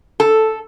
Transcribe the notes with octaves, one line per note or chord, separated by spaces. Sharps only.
A4